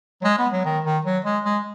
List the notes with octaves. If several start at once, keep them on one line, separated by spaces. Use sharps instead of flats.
F#3
G#3
B3
F#3
D#3
D#3
F#3
G#3
G#3